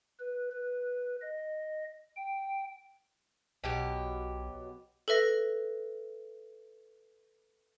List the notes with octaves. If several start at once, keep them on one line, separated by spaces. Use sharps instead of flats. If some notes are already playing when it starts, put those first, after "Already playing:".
B4
B4
D#5
G5
B1 B2 F#3 G4 G5
A4 B4 E5 A#6